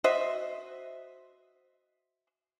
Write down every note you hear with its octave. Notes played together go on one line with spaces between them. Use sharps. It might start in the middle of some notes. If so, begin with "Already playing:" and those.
F#4 C5 D#5 E5